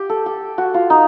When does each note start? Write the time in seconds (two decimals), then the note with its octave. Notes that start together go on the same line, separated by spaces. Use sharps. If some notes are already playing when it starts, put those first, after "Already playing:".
Already playing: G4
0.10 A4
0.26 G4
0.58 F#4
0.74 F4
0.90 D#4